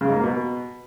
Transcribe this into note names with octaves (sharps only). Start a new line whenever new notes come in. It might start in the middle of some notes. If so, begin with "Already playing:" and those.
C#3
G#2
A#3
B2